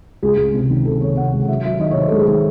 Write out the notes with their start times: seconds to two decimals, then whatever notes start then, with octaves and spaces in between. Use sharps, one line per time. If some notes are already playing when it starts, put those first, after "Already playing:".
0.22 C#2 G#4
0.37 C#2
0.54 C3
0.69 D#3
0.85 C3 A4
1.01 D#3 C#5
1.17 C3 F#5
1.33 C#2
1.48 F#3 E5
1.64 F#3 E5
1.80 D#3 D#5
1.90 C#5
1.96 D#3 C5
2.08 A4
2.12 G#2 G#4
2.24 D#3 A4